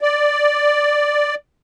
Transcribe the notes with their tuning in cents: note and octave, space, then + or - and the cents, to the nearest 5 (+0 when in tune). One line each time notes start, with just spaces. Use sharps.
D5 +5